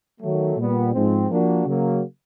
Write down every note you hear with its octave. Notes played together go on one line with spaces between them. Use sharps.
D#3 F#3 A3
A#2 G3 B3
G#2 F3 G#3 C4
F3 A#3 D4 F#4
C#3 F#3 A#3